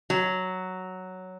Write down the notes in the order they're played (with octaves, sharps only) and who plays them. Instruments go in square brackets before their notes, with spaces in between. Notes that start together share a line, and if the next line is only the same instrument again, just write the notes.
[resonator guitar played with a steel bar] F#3